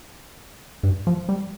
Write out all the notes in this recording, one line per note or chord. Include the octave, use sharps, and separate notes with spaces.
G2
F3
G3